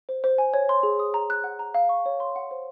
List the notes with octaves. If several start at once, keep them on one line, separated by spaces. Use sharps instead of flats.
C5
C5
G#5
C#5
C6
G#4
D#6
A#5
F#6
F#5
A#5
F5
C#6
C#5
C6
F#5
C5